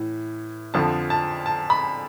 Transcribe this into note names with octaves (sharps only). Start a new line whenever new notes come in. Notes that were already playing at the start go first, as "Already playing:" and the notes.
Already playing: A2 E3
F2 D3 F3 A5
A5
A5
B5